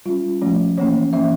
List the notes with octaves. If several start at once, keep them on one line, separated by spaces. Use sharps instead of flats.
G3 C#4 F4
F3 A3 C#4
E3 A#3 C#4 C#5
E3 A#3 C#4 E5